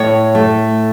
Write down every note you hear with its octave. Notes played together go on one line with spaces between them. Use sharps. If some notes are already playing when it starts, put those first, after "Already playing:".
Already playing: A2 C#5
A3